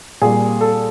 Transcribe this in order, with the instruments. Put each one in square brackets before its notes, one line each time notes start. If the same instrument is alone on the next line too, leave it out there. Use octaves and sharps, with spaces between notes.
[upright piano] A#2 G3 G#4
A4